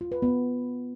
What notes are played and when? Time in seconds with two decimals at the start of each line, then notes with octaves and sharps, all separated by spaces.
0.01 F4
0.12 B4
0.22 B3